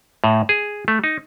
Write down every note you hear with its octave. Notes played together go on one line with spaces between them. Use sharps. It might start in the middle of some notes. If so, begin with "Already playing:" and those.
A2
G#4
A3
D#4